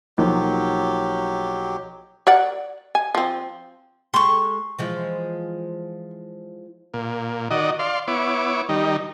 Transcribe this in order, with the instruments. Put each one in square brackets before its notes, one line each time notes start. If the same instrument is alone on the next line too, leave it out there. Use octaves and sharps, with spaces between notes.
[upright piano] B1 F3 A#3 [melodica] F#3 G4
[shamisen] A#4 D5 F#5
G#5
F3 C4
[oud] G#3 G4 A4 [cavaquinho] C6 C#6
[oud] E3 F3 G#3
[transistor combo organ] A#2
D#3 F#4 D5 D#5
D5 F5 C6
B3 E4 C#5 D6
D#3 G3 D#4